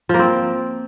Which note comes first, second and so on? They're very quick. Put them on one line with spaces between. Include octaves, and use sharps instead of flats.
F3 A#3 C4